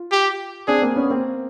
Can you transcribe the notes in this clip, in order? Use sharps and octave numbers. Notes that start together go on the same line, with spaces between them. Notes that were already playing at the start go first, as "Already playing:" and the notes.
Already playing: F4
G4
C4 D4 G#4
A#3 C4
B3 C#4
A#3 C4